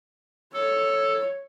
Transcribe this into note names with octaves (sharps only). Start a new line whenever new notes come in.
A4 C#5